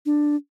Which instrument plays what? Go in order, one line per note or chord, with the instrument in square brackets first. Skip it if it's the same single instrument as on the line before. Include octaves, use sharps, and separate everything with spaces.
[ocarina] D4